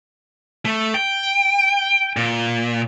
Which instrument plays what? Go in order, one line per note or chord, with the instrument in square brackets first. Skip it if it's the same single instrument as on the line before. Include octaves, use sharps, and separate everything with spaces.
[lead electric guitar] A3
G5
A#2